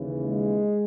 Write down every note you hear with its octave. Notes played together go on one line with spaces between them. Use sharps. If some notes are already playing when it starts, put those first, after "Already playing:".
Already playing: D#2 C#3 E3
G#3